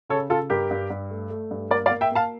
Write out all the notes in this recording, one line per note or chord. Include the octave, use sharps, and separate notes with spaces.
C#3 A4 C#5
C#3 F4 A4
G2 G4 A#4
G2
G2
A3
A3
G2
A#3 A#4 D5
D5 F5
A#3
E5 G5
A#3 F5 A5